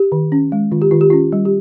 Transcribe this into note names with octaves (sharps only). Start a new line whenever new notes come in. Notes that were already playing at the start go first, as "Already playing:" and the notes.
Already playing: G4
D#3
C#4
G#3
D#3 F4
G4
D#3 F4
G4
C#4 F4
G3
G4